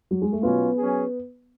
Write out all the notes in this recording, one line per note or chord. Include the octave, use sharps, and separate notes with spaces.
F#3
G#3
A3
B2 F#3 B3 C#4 F4
F#3 C#4 G#4